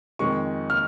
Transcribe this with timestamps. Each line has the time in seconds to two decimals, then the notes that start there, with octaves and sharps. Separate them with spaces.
0.19 F2 D#3 G#3 C#6
0.70 F6